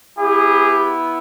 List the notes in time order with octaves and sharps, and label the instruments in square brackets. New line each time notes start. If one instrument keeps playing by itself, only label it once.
[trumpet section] B3 E4 G4 G#4